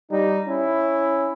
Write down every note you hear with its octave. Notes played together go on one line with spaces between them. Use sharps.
G3 D#4
C#4 E4